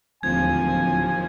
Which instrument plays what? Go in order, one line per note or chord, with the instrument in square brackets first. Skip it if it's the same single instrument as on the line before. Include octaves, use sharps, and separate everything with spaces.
[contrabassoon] D1 [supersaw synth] D#2 F3 [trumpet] G#5 [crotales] G#6